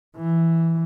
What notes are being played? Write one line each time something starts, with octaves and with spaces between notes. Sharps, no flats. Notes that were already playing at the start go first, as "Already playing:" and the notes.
E3